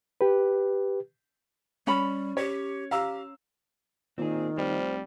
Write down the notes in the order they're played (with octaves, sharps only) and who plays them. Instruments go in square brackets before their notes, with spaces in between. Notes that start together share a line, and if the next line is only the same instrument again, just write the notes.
[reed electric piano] G4 B4
[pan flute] G3 [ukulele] C#4 B5
[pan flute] G4 [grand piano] C#5
[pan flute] G4 [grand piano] F5 A#5 E6
[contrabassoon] A#2 [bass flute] D#3 [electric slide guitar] C4 G#4
[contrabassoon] F1 [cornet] G3 [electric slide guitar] F4 C5